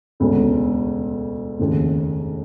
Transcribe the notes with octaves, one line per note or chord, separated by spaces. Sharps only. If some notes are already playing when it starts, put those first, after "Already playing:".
E1 D2 C#3
F1 D#2 C#3